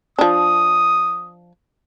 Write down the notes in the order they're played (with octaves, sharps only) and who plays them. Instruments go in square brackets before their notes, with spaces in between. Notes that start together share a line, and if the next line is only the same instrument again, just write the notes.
[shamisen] F3 D4 [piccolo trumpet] D#6